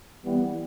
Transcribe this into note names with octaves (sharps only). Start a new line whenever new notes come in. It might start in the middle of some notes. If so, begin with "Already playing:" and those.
E3 G3 B3